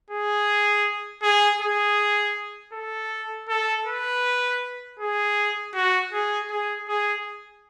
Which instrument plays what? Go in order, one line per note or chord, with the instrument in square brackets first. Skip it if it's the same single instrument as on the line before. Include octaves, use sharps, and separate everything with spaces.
[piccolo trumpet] G#4
G#4
G#4
A4
A4
B4
G#4
F#4
G#4
G#4
G#4